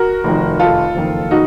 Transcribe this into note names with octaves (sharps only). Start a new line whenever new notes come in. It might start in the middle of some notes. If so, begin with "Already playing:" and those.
Already playing: F#4 A#4
F1 F2 D#3
F4 A4
F#1 F2 D#3
D#4 F#4